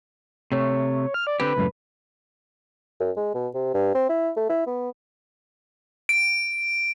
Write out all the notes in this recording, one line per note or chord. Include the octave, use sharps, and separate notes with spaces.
C3 A3 C#5
F6
D5
D3 C4 G4 B4
C#2 F#2 A2
F#2
G#3
B2
C3
G2
C4
E4
A3
E4
B3
D7